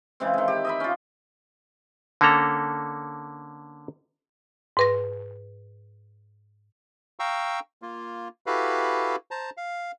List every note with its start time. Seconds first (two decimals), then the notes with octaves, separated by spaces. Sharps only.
0.20 C#3 E3 G#3 C4
0.34 D#3 G#3
0.48 G4
0.65 D#5 E5 B5
0.80 C#4 F4
2.21 D3 A#3 C#4 A4 A#5
4.77 G#2 B4 A#6
7.20 F5 G5 A#5 C#6 E6
7.82 A#3 F4
8.46 E4 F#4 G4 A4 B4 F5
9.31 C5 A5 A#5
9.57 F5